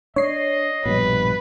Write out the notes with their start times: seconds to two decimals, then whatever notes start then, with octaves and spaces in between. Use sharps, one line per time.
0.16 D4 C#5 D#5 C7
0.86 A#1 G2 B2 B4